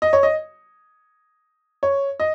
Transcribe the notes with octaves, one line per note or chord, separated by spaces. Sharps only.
D#5
C#5
D#5
C#5
D#5